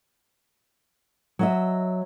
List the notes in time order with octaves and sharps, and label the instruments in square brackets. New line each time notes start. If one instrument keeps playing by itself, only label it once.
[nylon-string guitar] F#3 D#5 E5